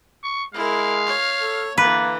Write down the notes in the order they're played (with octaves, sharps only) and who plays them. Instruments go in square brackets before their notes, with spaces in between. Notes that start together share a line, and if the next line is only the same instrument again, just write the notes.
[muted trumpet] C#6
[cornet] G#3 [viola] E4 A#4 [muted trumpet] F5
[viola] C#5
[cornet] A4
[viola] D3 E3 [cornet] A#3 [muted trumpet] B3 [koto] B4